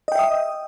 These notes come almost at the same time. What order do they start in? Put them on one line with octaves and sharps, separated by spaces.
D#5 G5 E5 D#6